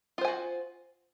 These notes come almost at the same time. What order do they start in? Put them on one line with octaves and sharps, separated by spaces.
F4 C5 G#5 F#4